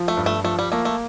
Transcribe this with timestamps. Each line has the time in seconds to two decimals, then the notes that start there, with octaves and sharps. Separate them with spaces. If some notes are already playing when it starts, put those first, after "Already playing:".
Already playing: F3
0.08 A3
0.17 G2
0.26 A3
0.44 F3 A3
0.59 G3
0.72 A3 A#3
0.85 A3